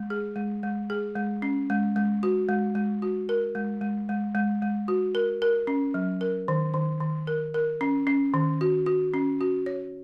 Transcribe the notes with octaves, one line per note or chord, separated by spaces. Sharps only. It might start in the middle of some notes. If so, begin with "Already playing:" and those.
Already playing: G#3
G#4
G#3
G#3
G#4
G#3
C#4
G#3
G#3
F#4
G#3
G#3
F#4
A#4
G#3
G#3
G#3
G#3
G#3
F#4
A#4
A#4
C#4
F#3
A#4
D#3
D#3
D#3
A#4
A#4
C#4
C#4
D#3
F#4
F#4
C#4
F#4
C#5